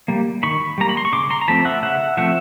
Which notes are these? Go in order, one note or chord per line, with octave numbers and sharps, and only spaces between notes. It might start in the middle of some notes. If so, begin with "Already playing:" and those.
G3 A#3
D#3 B5 C#6
G3 A#3 A#5
B5
C6
C#6
C#3 C6 D6
A#5 C6
A#5
F3 A3 C4 A5 B5
E5 F#5
C#3 E5 F#5
F3 A3 C4 E5 F#5